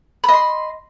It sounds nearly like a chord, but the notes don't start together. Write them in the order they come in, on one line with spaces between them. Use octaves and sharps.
B5 D#5 C6